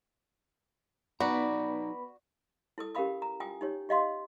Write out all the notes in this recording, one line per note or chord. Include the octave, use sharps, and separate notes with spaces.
F#3 B3 D#4 F#4 B4 D5 A#5 B5
E4 A4 D#6
C#4 G4 A#4 F5 B5 D#6
A#5
F4 G5 G#5 D#6
D#4 G4 C#5
G4 D#5 F5 C6